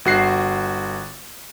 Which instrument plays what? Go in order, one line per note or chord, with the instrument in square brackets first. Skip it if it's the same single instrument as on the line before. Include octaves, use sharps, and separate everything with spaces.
[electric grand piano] G1 F#4 C7